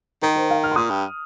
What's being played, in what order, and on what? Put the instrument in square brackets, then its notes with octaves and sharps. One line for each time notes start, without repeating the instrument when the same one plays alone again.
[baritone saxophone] D#3 [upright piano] A#4
[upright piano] C5
F5
F6
C6
[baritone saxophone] A#2 [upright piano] D#6
[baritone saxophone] G2